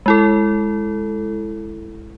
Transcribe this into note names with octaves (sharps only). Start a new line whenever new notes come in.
G#3 E4 A4